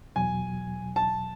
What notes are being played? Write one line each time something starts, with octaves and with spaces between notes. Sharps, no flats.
E2 B2 F#3 G#5
A5